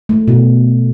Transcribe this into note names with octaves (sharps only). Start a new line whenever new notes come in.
A3
B2